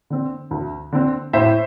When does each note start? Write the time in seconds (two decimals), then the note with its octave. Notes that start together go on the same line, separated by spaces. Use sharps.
0.10 D3 C4
0.51 D2
0.92 D3 C4
1.33 A2 C5 E5